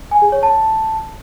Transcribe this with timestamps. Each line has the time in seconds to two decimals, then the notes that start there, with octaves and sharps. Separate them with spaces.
0.11 G#5
0.22 G#4
0.32 C#5
0.43 A5